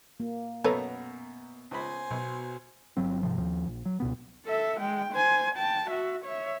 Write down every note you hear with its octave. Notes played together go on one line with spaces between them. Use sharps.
A#3
F#2 B2 B3 A4 B4 C#5 A#5
C#2 C5 G#5 B5
B1 B2
G1 F#3 C4
G#2 C3 F3
D#2 F3
A#1
F#3
C#2 B2 B3
A4 E5
G#3 G5
C5 G#5
G5 A5
F#4 E5
C#5 E5